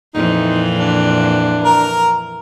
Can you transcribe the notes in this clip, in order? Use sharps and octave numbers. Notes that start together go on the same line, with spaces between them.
F2 A#2 E3 D#4
D4
A#4 A#5